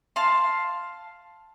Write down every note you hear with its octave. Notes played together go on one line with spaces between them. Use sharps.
F5 A5 C6